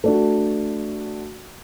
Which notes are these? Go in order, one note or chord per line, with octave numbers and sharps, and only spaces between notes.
A3 D4 F#4